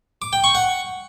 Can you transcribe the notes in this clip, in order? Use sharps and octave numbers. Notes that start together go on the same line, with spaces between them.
D6
G5
C#6
F#5